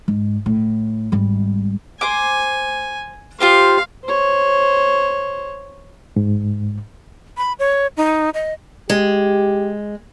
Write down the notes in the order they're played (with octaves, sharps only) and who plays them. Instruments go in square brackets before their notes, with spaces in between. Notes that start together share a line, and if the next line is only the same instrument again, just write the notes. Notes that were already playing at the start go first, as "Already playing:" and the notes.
[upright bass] G#2
A2
G#1 G3
[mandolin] C5 D6 [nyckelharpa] G#5
[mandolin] F4 G4 C5 [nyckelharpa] F5
[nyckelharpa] C5 C#5
[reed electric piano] G#2
[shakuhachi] B5
C#5
D#4
D#5
[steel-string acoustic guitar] G#3 [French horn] G4